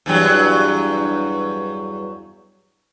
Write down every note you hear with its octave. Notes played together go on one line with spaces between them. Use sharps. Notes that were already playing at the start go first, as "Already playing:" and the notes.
E2 G2 F#3